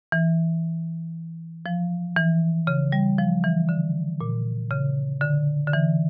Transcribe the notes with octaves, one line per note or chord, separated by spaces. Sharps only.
E3
F3
E3
C#3
G3
F3
E3
D3
A#2
C#3
D3
D3
E3